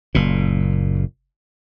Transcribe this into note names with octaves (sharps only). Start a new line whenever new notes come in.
F#1 A#2